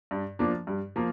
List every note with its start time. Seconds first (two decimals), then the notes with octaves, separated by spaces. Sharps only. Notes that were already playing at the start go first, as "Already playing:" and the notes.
0.11 G2
0.39 F3 A#3 D4
0.67 G2
0.96 F3 A#3